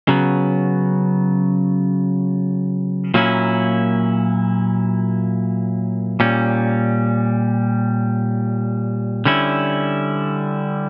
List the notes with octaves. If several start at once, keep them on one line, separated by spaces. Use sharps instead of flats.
C#3 F#3 B3
A#2 F#3 A#3 C#4 E4
A#2 G3 C#4
D3 G3 C#4 E4